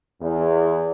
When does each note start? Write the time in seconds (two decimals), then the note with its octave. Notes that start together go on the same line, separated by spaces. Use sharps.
0.21 E2